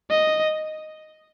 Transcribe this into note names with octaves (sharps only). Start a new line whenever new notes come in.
D#5